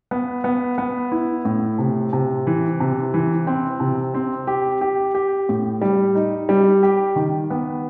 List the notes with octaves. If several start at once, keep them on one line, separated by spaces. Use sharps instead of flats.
B3
B3
B3
E4
A2
C3
C3
E3
C3
E3
C4
C3
C4
G4
G4
G4
A2
G3
D#4
G3
G4
D#3
B3